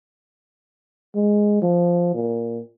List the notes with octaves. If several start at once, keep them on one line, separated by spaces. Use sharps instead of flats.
G#3
F3
A#2